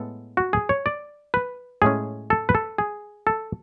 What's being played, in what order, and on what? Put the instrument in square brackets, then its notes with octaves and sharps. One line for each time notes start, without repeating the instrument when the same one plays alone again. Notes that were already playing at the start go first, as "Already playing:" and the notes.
Already playing: [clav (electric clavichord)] A2 G#3 B3 A4
F#4
G#4
C#5
D5
B4
A2 G#3 C#4 G#4
A4
B4
A4
G#4
A4